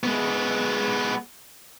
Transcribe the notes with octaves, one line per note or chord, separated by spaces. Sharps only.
G#3 B3